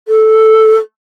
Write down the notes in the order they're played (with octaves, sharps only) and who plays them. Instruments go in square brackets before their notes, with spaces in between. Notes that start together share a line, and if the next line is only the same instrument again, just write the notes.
[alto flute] A4